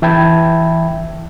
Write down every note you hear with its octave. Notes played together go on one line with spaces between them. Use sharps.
E3 E5 G5 A5 B5 G#6